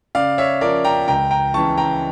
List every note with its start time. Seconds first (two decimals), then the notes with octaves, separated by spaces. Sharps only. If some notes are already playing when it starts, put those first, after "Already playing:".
0.15 C#3 D5 F5
0.38 C#5 E5
0.61 F3 C#4 A#4 D5
0.84 G5 A#5
1.08 C#2 G5 A#5
1.31 G5 A#5
1.54 C#3 E3 A5 C#6
1.77 G5 A#5